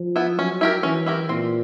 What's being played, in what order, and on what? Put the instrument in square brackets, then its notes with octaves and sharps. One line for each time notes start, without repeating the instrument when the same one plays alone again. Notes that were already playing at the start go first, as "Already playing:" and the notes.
Already playing: [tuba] F3
[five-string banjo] B3 E4
[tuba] F#3 [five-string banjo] C#4
[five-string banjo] E4 G4 A#4
[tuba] E3 [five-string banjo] C#4
[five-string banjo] E4 G4 A#4
[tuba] A#2 [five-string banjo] C4